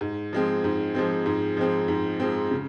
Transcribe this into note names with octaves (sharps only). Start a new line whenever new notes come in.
G#2
F3 G#3 C4
G#2
F3 G#3 C4
G#2
F3 G#3 C4
G#2
F3 G#3 C4
C#3